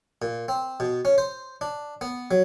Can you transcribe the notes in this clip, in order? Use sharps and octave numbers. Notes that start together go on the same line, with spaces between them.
A#2
C4
B2
C#4
C5
D4
B3
F#3